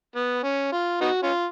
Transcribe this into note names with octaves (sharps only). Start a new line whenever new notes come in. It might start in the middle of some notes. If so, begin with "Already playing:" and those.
B3
C#4
F4
B3 D#4 F#4
C#4 F4